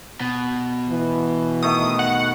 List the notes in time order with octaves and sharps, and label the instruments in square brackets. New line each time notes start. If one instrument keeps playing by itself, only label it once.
[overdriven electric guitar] B2
[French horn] E3
[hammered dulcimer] D#3 A3 [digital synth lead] D#6
[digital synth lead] F#5